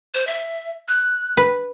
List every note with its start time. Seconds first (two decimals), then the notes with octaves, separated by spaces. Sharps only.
0.14 C5
0.27 E5
0.88 F#6
1.37 B4